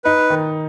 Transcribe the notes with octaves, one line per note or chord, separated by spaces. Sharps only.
D#4 B4
D#3